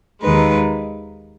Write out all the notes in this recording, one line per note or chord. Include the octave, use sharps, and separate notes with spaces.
D#2 D#3 G#3 B4